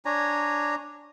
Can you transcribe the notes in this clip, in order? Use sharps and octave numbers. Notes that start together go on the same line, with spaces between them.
D4 C#5 G#5 A#5